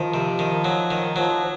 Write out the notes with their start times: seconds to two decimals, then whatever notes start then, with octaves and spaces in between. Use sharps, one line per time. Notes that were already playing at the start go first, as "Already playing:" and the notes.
Already playing: D#3 F3
0.14 C3
0.39 D#3
0.64 F#3
0.91 D#3
1.16 F3 F#3